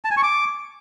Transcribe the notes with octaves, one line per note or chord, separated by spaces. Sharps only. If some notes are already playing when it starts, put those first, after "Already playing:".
A5
G#5
C#6
D6